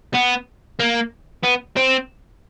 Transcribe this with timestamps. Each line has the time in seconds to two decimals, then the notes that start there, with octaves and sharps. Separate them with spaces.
0.15 B3
0.79 A#3
1.43 B3
1.76 C4